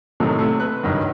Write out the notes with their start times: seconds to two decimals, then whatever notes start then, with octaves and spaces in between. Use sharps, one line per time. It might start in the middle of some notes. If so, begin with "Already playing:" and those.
0.20 A2 C3 D#3 E3 F#3 A#3
0.38 C3 A3
0.60 B4 F#6
0.83 C#2 G2 D#3 F#3